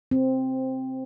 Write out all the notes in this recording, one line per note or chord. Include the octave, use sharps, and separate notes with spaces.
C4